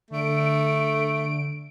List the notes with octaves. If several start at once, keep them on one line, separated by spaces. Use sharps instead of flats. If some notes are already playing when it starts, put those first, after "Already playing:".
D3 A3 D7